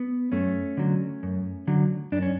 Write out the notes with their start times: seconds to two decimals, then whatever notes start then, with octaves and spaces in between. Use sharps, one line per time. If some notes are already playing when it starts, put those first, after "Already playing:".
Already playing: B3
0.32 F#2 A3 C#4
0.77 D3 F#3
1.23 F#2
1.67 D3 F#3
2.12 F#2 D4
2.22 C#4